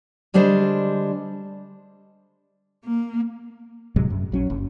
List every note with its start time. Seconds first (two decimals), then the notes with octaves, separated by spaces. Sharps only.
0.34 D3 G3 G#3 D4 C5
2.85 A#3
3.96 A2 C3 F#3 G#3
4.10 F#2
4.32 A#1 F#3 C#4
4.50 F#1